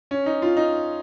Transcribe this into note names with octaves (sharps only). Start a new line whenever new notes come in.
C#4
D#4
F4
D#4